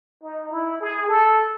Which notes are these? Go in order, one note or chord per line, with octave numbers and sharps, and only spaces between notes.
D#4
E4
G#4
A4